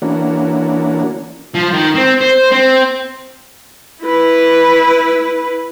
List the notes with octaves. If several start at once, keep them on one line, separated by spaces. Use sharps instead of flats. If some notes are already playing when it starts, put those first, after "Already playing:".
E3 A#3 C#4 D4 F#4
F3
D#3
C4
C5
C4
E4 B4